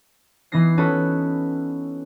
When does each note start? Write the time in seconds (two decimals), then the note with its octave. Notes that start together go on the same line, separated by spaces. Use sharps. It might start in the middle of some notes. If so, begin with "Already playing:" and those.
0.52 E3 B3 D#4 A#6 C7
0.77 C#4 D#4 F#4 A4 B4 C#5